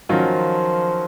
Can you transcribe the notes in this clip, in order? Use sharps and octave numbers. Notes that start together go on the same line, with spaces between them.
D#3 F3 F#3 C#4 F4